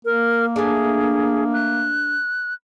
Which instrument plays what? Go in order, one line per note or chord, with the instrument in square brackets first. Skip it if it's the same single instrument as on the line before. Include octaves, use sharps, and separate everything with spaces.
[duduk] A#3 [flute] A#4
[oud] A3 D4 [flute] G#4
[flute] F#6